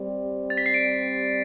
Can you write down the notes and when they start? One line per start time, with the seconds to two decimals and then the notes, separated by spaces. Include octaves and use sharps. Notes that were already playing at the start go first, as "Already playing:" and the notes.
Already playing: G3 C4 G4 D5
0.50 A6
0.57 B6
0.66 C7
0.74 D7